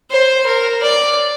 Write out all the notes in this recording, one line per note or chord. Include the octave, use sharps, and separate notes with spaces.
C5
A#4
D5